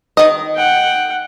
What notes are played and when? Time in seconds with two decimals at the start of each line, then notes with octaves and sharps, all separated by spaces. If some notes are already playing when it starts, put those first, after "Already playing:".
0.17 D#3 D#5
0.55 F#5 G5